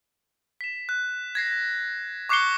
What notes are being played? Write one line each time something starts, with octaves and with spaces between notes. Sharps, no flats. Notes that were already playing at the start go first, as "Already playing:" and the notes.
B6 E7
F#6
G#6 A#6 C7
C#6 D6 F#6 C7 C#7 G7